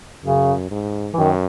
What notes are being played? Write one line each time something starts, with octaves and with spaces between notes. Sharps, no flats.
F#2 C#3
G#2
E3
F#2 D#3